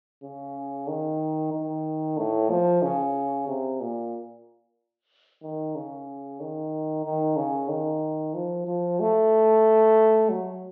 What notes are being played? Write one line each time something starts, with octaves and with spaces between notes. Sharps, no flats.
C#3
D#3
D#3
A2
F3
C#3
C3
A#2
D#3
C#3
D#3
D#3
C#3
D#3
F3
F3
A3
F#3